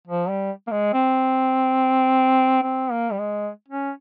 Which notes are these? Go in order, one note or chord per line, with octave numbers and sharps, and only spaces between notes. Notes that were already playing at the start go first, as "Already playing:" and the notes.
F3
G3
A#3
G#3
C4
C4
A#3
G3
G#3
C#4